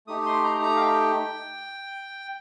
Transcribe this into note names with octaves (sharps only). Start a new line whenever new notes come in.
A3 D#4 G4 D#6
C6
A#5
A#5
F5
G5